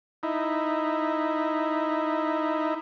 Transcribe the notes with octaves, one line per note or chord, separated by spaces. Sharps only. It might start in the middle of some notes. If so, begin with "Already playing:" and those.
D#4 E4